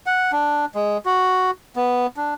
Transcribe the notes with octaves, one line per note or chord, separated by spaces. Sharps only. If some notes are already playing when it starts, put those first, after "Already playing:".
F#5
D4
G#3
F#4
B3
D4